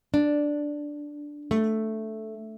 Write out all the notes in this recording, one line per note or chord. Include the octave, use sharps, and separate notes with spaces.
D4
A3